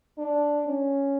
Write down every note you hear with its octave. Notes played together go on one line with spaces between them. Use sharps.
D4
C#4